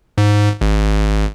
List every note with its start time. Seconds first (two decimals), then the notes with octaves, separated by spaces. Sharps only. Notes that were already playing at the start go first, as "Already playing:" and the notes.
0.18 G#2
0.61 G#1